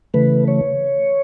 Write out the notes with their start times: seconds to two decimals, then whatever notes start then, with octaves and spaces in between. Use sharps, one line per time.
0.14 C#3 E3 A3 B4
0.48 C#5